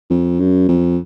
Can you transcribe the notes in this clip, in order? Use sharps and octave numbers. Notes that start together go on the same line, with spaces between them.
F2
F#2
F2